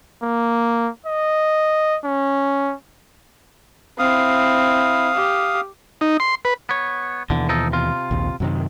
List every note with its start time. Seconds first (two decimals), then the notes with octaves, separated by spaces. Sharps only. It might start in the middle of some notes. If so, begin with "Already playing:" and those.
0.23 A#3
1.06 D#5
2.04 C#4
3.99 C4 E4 F5 D#6
5.14 G4
6.01 D#4
6.20 C6
6.45 B4
6.69 B3 C#5
7.30 D#2 B2 D3 E3
7.49 F3 D#4 A4
7.72 C3 F4
8.11 A#1 D#2
8.40 F#2 C3 D#3